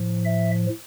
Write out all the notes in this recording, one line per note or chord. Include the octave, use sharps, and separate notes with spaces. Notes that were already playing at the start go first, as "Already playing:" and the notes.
Already playing: A2 F3
E5